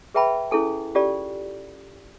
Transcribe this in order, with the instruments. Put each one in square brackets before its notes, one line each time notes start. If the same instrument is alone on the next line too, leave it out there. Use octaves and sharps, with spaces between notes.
[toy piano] G#4 B4 E5 G5 A5 B5
C#4 E4 G#4 A4 G#5
C#4 F4 G4 A4 D5